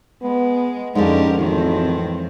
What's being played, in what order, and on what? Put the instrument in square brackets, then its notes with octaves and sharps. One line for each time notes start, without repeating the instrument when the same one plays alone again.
[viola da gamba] G#3 [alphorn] B3
[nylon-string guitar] F2 G#3 [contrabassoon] G#2 [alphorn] D3 [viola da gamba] C#4 G4 A#4
[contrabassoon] G#1 [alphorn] A2 [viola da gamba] D#3 E3 C4